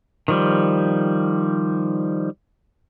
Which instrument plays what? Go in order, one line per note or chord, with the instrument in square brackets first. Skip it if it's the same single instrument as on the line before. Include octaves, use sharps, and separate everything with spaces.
[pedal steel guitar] D#3 F3 G3